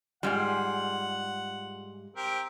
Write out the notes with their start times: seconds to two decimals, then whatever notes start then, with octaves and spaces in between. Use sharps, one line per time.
0.23 G#2 G3 F4 G#4 F#5
2.16 C4 G4 A#4